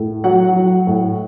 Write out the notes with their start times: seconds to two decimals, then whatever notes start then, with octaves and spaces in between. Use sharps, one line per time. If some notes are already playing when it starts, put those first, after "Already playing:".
Already playing: A2
0.24 F#3 F#5
0.55 F#3
0.87 A2